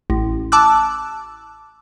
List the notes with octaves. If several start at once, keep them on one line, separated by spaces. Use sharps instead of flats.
A1
A5 D6 E6 F#6